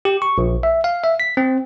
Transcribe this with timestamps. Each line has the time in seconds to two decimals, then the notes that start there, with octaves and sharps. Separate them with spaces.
0.05 G4
0.22 C#6
0.38 A#1
0.63 E5
0.84 F5
1.03 E5
1.20 B6
1.37 C4